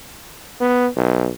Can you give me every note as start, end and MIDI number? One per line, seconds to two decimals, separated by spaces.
0.61 0.88 59
0.96 1.30 35